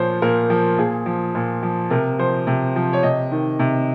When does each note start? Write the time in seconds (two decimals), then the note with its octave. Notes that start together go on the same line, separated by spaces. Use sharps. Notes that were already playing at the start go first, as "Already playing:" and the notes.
Already playing: A#2 F3 C5 C#5
0.22 A#2 A#4
0.50 F3
0.78 A#2 G#4
1.06 F3
1.35 A#2
1.63 F3
1.90 C3 A#4
2.19 F3 C5
2.47 C3
2.76 F3
2.93 C#5
3.03 C3 D#5
3.31 D#3
3.59 C3